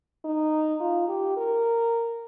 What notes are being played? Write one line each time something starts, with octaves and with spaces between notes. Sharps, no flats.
D#4
F4
G4
A#4